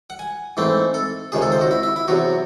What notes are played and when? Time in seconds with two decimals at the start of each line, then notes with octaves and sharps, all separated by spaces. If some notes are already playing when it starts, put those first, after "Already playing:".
0.10 F#5
0.19 G#5
0.57 G#2 E3 A3 C4
0.94 A4
1.32 C#2 C3 D#3 G#4
1.42 A4
1.52 C5
1.61 F#4
1.71 E4
1.83 E4
1.96 E4
2.08 E2 C3 F#3 F#4